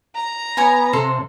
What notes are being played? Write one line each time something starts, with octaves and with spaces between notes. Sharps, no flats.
A#5
B3 C#5 G#5 C#6
C3 A4 C6